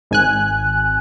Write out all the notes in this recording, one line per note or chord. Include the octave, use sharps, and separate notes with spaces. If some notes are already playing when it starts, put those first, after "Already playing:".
G#1 G#5 F#6